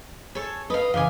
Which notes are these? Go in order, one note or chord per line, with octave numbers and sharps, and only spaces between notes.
G#4 A4 C#5
A4 B4 D#5 F5
C#3 E3 D#5 F5 G#5 D6